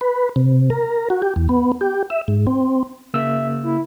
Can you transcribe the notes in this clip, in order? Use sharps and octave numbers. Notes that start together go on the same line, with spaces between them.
B4
C3
A#4
F#4
G4
E2
B3
G4
E5
G#2
C4
C#3 A#3 E5 E6
E4